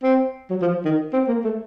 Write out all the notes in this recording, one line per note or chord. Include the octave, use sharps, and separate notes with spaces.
C4
F#3
F3
D#3
C4
A#3
A3